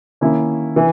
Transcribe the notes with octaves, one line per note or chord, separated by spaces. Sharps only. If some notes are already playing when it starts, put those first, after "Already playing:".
D#3 A#3 C#4 E4
E3